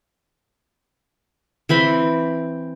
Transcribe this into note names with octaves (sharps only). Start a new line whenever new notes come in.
E3 C4 B5 C6